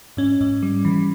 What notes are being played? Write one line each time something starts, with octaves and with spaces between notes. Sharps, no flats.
G#2 C#4
G#2
G3
E3